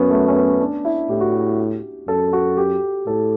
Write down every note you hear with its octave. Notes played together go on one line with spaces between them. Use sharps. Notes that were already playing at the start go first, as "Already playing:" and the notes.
Already playing: F#2 B3 C#4
A3
C#4
B3
D4
E4
A2 G4
F#4
G4
F#2 A4
F#4
G4
A2 A4